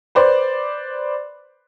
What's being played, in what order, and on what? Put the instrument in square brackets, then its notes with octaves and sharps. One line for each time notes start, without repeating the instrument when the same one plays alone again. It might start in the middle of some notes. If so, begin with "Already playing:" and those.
[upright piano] B4 C5 D5